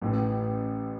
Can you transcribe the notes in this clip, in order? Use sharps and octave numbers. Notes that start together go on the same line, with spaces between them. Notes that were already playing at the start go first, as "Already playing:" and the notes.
A1 A2 E3